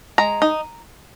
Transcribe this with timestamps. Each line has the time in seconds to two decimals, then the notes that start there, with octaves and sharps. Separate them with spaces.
0.18 G#3 A#5
0.42 D#4